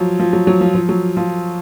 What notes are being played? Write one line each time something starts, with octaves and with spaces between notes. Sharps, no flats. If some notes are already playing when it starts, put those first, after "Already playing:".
Already playing: F3 F#3
F3
F#3
F#3
F3
F3
F#3
F3